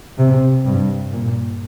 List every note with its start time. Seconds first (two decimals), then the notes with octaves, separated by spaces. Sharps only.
0.17 C3
0.64 G2
1.11 A#2